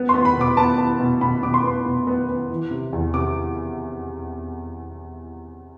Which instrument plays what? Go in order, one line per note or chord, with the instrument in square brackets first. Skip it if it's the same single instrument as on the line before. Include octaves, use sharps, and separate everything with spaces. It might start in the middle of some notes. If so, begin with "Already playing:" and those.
Already playing: [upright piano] B3
C6
B3
B5
B2 D6
B3 A5
B3
B2
B2 B5
B2 D6
C6
B3
B2
B3
B3
E3
C3
E2
C3 D6